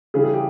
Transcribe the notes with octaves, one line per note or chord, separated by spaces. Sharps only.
C#3 E3 G3 G#4
G#4
G4